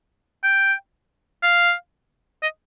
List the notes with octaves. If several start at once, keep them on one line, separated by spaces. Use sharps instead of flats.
G5
F5
D#5